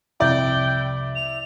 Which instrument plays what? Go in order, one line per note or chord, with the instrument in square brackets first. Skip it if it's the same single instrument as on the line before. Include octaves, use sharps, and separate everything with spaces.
[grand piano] C2 F2 [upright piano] E4 D5 [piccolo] G5
[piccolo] F7